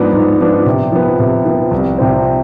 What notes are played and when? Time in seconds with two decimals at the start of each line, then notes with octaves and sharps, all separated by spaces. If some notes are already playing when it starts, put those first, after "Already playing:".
Already playing: G#2 F3 B3 D4
0.13 G#2
0.40 F3 B3 D4
0.66 C3
0.92 F3 B3
1.20 C3
1.45 F3 B3
1.71 C2
1.98 C3 F3 C4